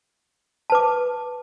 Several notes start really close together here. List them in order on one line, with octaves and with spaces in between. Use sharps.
A5 B4 D6